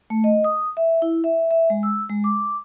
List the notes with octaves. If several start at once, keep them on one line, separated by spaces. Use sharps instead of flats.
A3
D#5
D#6
E5
E4
E5
E5
G#3
E6
G#3
D6